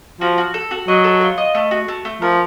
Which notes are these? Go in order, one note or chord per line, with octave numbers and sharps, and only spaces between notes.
F3 F#4
F#4
A4
F#4
F#3 D#5
A4
F4
D#5
A3
F#4
A3
A3
F3 A#4